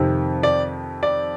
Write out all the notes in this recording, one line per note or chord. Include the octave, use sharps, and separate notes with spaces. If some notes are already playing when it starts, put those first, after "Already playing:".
Already playing: F2 C3 D#3
D5
D5